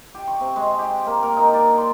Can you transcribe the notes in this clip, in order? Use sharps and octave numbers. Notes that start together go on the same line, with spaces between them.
G4
C#6
C3
G#3
G4
A#3
A#4
D#4
D5
C6